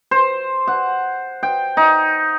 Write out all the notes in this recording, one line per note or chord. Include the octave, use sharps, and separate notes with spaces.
C5
F#5
G5
D#4